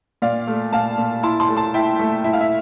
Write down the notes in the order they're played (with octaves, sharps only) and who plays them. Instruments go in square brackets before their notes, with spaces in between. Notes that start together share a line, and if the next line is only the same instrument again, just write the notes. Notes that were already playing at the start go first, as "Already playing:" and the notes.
[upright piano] A#2 D5 F5
A3
A#2 F5 A5
A#2
E4 A5 C6
A5 C6
A3
A5 C6
E4 E5 G5
A3
E4 E5
F5
E5